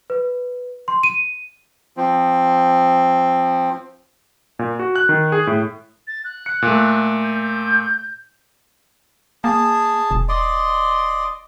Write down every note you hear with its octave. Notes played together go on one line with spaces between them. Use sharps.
B4
C6
D#7
F3 C4
A#2
F#4
F#6
D#3
G#4
A2
A6
F#6
C#7
A#2 A3
G6
A#3 G#4 A5
E1
D5 D#5 C6